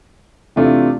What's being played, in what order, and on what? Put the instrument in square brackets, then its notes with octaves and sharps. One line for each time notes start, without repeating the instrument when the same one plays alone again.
[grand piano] C3 E3 A3 D4 F4